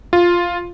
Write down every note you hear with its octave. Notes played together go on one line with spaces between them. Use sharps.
F4